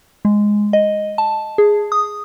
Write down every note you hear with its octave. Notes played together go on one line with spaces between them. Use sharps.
G#3
D#5
A5
G#4
D#6